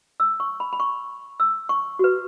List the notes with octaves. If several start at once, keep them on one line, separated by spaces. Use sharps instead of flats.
E6
C#6
B5
B5
C#6
E6
C#6
F#4 B4